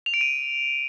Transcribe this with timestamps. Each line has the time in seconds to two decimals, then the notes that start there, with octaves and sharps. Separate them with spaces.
0.06 F7
0.14 D7
0.21 D#7